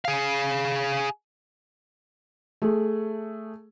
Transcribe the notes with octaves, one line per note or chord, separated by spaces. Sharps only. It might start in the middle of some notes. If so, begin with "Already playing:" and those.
G#4 F5
A3 G#4